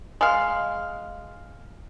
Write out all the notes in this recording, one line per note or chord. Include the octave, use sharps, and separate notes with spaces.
G#3 F5